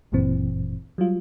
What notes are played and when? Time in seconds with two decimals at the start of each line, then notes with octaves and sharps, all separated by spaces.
0.12 G1 F#2 A#2 E3 C4
0.98 F#3 G3 F4